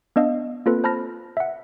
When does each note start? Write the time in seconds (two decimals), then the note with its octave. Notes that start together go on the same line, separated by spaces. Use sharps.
0.16 B3 D4 D#5 F5 E6
0.66 A#3 C4 F4 A4 B4
0.84 C5 A5 B5 F6 A#6
1.37 E5 F#5